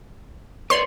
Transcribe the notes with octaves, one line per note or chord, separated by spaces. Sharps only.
B4 C#5 D5 C6